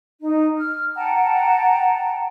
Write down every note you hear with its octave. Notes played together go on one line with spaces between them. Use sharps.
D#4
F6
F#5 G5 A5 A#5